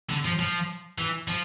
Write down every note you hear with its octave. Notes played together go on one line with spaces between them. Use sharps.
D3
F3
F3
E3
F3